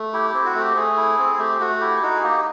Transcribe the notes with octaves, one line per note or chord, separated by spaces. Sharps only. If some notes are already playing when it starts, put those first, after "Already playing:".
Already playing: A3
E4 G4
C4 G4
F#4
A3
G4
A3 G#4
E4
C4
A3 G4
A3 F#4
E4 G4
D#4 F#4
G#4
A#3 G4